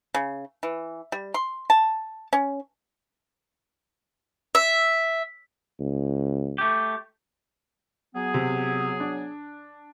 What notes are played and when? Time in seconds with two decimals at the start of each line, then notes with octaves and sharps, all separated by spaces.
0.14 C#3
0.63 E3
1.12 G3
1.34 C6
1.70 A5
2.33 C#4
4.55 E5
5.80 C#2
6.58 A3 G4
8.15 F#3 B3 G#4
8.34 C3
9.00 D4